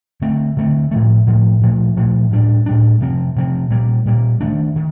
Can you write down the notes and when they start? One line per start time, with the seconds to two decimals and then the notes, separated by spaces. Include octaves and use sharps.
0.22 D3 A3 C4
0.57 D3 A3 C4
0.91 A2 F3 A3
1.27 A2 F3 A3
1.61 A#2 F3 A3
1.97 A#2 F3 A3
2.31 A2 G3 D4
2.66 A2 G3 D4
3.01 C3 F3 C4
3.36 C3 F3 C4
3.70 A#2 G3 A#3
4.06 A#2 G3 A#3
4.41 D#3 A3 D4
4.76 D#3